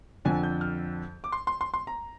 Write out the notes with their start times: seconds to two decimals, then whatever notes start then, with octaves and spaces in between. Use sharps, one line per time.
0.25 F2 D3 F3 G#5
0.43 G6
0.61 F6
1.24 D6
1.32 C6
1.47 C6
1.61 C6
1.74 C6
1.87 A#5